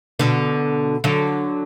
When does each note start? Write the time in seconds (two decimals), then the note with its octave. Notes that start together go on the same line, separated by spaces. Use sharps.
0.19 B2 D3
1.04 D3 F#3